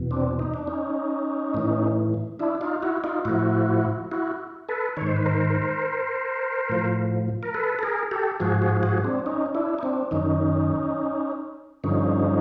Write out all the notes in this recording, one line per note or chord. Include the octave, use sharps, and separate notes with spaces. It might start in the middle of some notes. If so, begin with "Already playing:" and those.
Already playing: E2 B2
C4 D4
D#4
D4
C#4 D#4
A2 E3
D4 E4
D#4 F4
E4 F#4
D#4 F4
A2 F3 E4 F#4
E4 F#4
A4 B4
G#2 D#3 C#5
C5
B4
A#4 C5
A2 F3
A#4
A4 B4
A4
G#4 A#4
G4 A4
G#2 F3 F#4 G#4
F#4 G#4
F#4 G#4
C4 D4
C#4 D#4
D4 E4
D#4
C4 D4
F#2 D#3 C#4 D#4
G2 D3 F3 C#4 D#4